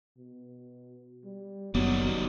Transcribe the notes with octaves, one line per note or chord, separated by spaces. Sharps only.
B2
G3
F#1 D#3 F#3 G3 B3